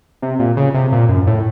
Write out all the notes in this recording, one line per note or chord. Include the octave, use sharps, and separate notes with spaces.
C3
A#2
C#3
C3
A#2
F#2
A2